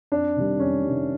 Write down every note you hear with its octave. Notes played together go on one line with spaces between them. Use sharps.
F2 D4
C3 D#3 G3
F2 C#4
C3 D#3 G3